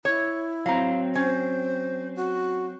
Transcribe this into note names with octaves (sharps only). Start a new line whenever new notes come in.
E4 C#5
F#3 C4 F5 A#5
C#4 C5
F#4